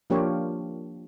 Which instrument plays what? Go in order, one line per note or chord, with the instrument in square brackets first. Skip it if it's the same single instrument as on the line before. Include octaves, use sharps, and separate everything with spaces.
[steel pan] F3 A#3 D4 F4 G4 C#5